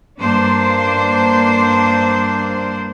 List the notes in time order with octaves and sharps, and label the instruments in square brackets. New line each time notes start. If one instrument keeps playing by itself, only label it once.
[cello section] G2 A#3 D4 C5